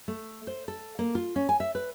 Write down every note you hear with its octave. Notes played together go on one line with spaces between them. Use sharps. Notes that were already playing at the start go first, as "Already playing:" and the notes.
A3
C5
A4
A#3
F4
C#4
G#5
E5
B4